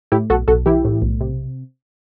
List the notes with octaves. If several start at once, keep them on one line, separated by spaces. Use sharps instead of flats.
A2 E4 G4
B1 F#4 A4
B1 F#4 A4
E3 E4 G4
A2
B1
C3